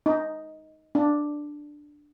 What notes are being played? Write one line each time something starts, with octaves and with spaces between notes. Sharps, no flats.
D#4
D4